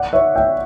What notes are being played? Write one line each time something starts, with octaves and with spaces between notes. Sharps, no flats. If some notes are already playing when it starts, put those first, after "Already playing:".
Already playing: D5 F#5
C#5 E5
E5 G5